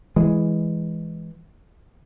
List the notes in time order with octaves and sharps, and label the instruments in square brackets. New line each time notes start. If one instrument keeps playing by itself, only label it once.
[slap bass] E3 G#3